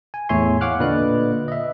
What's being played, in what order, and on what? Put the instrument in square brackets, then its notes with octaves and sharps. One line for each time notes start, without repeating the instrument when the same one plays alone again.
[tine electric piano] G#5
E2 A2 C#5 E5 G#5 C6
C#5 F5 F#5 D6 F6 F#6
A#2 D3 B4 D5 D#5 F#6
D#5 E5